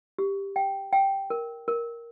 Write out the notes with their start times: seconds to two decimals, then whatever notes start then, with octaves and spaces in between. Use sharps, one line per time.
0.19 G4
0.56 G5
0.93 G5
1.30 A#4
1.68 A#4